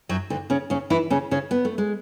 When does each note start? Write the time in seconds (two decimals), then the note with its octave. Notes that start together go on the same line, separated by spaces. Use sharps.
0.09 F#2 F#3
0.30 D2 D3
0.50 C#3 C#4
0.70 C#3 C#4
0.90 E3 E4
1.10 C#3 C#4
1.31 C#3 C#4
1.51 B3
1.65 A3
1.78 G#3